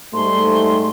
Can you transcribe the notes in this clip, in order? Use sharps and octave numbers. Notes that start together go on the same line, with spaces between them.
G#2 G3 A3 C6